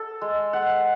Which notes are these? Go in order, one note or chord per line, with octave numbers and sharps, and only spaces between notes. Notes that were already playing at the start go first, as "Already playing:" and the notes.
Already playing: A4
G#3
G#3 F#5